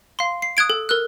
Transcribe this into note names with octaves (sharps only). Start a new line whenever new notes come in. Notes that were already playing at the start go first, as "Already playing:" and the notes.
F5 C6
C7
D#6 F#6 G#6 D7
A4
A#4 E6 F#6